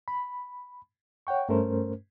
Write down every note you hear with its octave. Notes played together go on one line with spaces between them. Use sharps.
B5
C#5 F#5 G5 C#6
G2 A3 C#4 A#4 C5